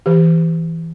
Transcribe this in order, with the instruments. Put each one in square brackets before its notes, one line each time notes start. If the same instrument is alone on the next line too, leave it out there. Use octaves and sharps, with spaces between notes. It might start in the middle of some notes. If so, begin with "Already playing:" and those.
[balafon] E3 G4